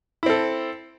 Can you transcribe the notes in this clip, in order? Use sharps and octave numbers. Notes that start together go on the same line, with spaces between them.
C4 E4 A4